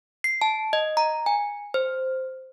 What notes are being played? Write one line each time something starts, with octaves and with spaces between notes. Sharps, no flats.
C7
A5
D#5
A#5
G#5
C5